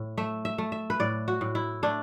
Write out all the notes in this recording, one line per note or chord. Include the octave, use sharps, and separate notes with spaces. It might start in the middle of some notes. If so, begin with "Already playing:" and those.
Already playing: A2
A3 E5
E5
A3
E5
B4
A2 D5
F#4
A2
E4
A3 D4